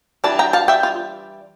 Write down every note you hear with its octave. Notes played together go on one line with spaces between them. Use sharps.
E3 G3 D4 A5
G5 A#5
F5 A5
E5 G5
F4